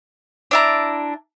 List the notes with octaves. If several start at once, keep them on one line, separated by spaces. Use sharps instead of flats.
D4 E4 A#5